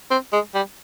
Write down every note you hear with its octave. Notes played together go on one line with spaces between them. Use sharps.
C4
G#3
G3